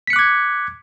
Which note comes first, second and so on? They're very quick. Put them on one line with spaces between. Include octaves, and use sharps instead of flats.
B6 C#7 F#6 D6 G#6